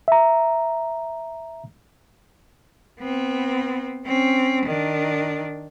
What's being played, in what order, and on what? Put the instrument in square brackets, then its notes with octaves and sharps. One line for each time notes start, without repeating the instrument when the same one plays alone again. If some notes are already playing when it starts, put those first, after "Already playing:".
[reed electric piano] E5 A#5
[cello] B3 C4
C4 C#4
D#3 D4